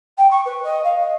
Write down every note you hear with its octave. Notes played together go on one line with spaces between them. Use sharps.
G5
C#6
B4
D#5
F5
D#5